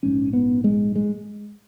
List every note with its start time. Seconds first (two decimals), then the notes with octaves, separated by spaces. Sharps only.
0.03 A#1 G#2 C#4
0.33 B3
0.64 G#3
0.95 G#3